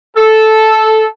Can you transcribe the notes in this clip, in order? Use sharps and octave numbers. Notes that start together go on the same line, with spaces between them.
A4